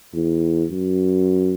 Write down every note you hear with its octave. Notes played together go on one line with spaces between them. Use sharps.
E2
F#2